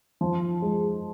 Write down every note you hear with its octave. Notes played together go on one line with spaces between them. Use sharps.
F3
G#3